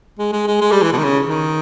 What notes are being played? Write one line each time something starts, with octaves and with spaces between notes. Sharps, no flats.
G#3
G#3
G#3
G#3
G3
E3
B2
D#3
C#3
D#3